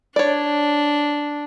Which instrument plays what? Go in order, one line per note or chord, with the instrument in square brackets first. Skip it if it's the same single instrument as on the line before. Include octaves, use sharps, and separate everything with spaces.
[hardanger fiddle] D4 [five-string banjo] C#5 D5